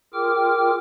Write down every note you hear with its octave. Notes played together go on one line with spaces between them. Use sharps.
F4 G#4 A#4 G5 D6 F6